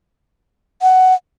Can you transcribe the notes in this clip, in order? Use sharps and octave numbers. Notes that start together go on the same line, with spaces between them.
F#5